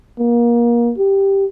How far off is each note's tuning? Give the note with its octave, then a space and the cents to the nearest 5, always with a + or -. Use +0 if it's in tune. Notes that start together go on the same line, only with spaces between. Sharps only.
A#3 +30
G4 +0